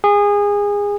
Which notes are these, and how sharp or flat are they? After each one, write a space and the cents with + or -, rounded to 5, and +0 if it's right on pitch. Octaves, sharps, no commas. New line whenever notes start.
G#4 -25